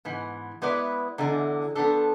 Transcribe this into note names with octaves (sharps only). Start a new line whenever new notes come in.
G#2 E3 B3
G#3 B3 E4 B4 D5
E2 D3 G#3
F3 B3 D4 A4